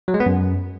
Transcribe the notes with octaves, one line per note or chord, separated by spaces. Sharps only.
F#3
G#3
B3
F#2